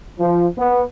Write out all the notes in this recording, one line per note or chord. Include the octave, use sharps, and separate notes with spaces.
F3
B3